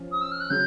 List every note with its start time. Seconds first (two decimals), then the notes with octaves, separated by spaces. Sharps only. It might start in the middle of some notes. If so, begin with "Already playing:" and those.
Already playing: F3 C#4
0.12 D#6
0.21 E6
0.32 F6
0.41 F#6
0.50 C#3 F#3 G6